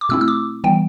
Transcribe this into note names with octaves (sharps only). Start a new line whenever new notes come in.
D6
B2 A3 C4 E4 E6
E6
D6
E3 G3 B3 G5